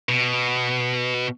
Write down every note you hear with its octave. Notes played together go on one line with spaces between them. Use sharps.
B2